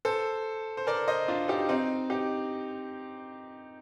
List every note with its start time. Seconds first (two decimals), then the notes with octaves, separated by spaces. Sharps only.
0.05 A4 C5
0.77 C5
0.87 A#4 D5
1.08 C5 D#5
1.28 D4 F4
1.48 D#4 G4
1.69 C4 D#4
2.10 D#4 G4